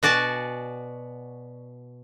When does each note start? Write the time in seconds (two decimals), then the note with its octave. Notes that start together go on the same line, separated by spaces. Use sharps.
0.03 B2 F#4 D5 G#5 A5